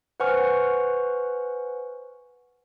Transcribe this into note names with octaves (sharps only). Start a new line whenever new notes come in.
B4 C5 F#5 G#5 C#6 F6